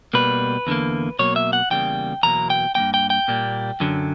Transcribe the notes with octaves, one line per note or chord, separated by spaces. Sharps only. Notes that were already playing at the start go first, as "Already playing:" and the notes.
B2 G3 A#3 B4
E2 D3 A#3
B2 F#3 A#3 C#5
E5
F#5
E2 C#3 G3 A#3 G5
E2 B2 F#3 A#3 A#5
G5
G2 F#3 A#3 G5
G5
G5
A#2 G3 A#3
F#2 D3 F#3